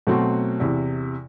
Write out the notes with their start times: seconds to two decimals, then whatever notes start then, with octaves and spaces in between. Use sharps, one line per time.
0.07 B2 F#3 A3 C4 F#4
0.60 E2 C3 E3